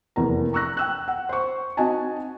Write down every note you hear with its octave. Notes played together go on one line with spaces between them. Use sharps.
F1 E2 A#3 A#5
A#5 C#6 E6 F#6 A#6
G5 E6 F#6
F#5
C5 C#6
C4 D#4 F#4 D#5 G#5 A5